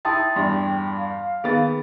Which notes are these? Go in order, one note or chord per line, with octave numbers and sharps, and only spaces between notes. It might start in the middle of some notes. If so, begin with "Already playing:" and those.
E4 G5 A5 C6 D#6 A6
E2 G2 G5 C6
F5
D#3 B3 G#4 A6